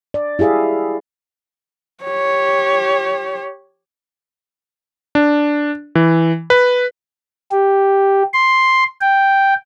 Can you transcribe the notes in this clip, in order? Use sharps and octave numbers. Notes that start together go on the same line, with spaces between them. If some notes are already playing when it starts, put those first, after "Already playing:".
D5
E4 G4 G#4 E5 F5
G4 C#5
D4
E3
B4
G4
C6
G5